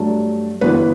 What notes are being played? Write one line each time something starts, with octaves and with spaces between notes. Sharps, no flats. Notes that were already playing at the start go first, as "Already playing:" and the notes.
Already playing: G2 F#3 A3 D4
G1 F#2 E3 B3 B4